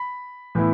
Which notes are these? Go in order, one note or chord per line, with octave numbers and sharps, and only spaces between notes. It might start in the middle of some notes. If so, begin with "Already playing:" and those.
Already playing: B5
A2 E3 B3 E4